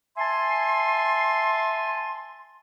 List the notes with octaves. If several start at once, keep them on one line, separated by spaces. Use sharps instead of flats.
E5 G#5 A5 C6